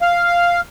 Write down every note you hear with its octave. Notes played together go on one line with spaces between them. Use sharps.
F5